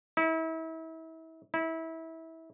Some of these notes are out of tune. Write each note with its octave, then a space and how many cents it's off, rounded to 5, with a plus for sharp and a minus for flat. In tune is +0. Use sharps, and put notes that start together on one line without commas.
E4 -35
E4 -25